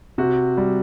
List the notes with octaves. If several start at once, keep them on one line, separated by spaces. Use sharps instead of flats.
C3 F#4
G3